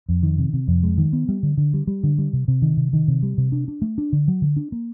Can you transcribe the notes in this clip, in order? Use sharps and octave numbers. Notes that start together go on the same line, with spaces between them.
F2
D#3
C3
C3
F2
G#3
D#3
B3
G3
D3
D3
G3
G3
D3
G3
C3
C3
D#3
C3
D#3
C3
G3
C3
D4
D4
A3
D4
D3
F#3
D3
D4
A#3